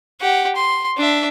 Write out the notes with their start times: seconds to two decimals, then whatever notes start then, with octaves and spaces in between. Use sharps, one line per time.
0.21 G4 F#5
0.56 C6
0.97 D4 E5